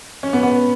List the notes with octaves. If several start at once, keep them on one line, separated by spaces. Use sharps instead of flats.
C#4
B3
B3